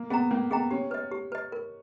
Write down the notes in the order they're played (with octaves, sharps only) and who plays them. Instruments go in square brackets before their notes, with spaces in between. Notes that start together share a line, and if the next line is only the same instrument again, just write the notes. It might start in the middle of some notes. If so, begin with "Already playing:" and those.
Already playing: [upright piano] A#3
[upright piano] B3 [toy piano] G#4 D#5 G5 A#5
[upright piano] A#3 [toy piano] C#4
[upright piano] B3 [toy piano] G#4 D#5 G5 A#5
[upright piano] C#4 [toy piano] G4
[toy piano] B4 D#5
G4
B4 D#5
A#4